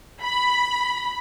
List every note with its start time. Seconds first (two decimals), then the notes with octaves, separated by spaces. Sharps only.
0.23 B5